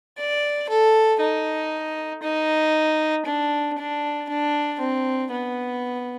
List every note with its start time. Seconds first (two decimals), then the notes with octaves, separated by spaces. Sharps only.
0.18 D5
0.69 A4
1.20 D#4
2.23 D#4
3.26 D4
3.78 D4
4.29 D4
4.80 C4
5.31 B3